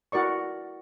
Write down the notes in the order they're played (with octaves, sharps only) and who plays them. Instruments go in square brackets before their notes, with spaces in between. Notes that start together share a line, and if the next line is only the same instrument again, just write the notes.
[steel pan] E4 F#4 A#4 D5 C#6